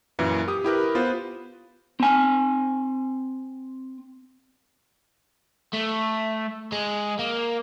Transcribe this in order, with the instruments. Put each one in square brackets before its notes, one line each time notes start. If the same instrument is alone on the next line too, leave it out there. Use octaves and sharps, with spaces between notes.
[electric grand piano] F#2 A#2 E3 E4
G4 D#6
E4 G4 A#4 B4
B3 F4 B4 C5
[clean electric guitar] C4 G#5
[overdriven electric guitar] A3
G#3
A#3